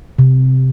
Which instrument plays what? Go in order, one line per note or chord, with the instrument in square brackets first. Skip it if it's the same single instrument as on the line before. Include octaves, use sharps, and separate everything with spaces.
[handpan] C3